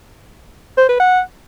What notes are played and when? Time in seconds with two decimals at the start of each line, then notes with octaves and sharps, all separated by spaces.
0.78 C5
0.89 B4
1.00 F#5